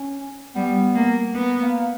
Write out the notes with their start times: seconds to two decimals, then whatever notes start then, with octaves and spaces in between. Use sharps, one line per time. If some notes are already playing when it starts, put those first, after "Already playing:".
Already playing: C#4
0.55 G3 B3
0.95 A#3
1.35 B3
1.62 A#3